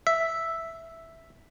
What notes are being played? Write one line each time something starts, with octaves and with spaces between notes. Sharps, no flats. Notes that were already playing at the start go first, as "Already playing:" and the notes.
E5